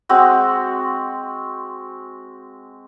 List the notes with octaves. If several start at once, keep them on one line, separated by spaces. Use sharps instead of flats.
G#3 C4 F#4